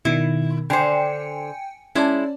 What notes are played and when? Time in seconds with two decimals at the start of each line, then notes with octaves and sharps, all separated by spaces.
0.05 B2 D#3 E4
0.70 D3 C5 G5 G#5 C#7
1.95 G#3 C#4 E4 D5 A5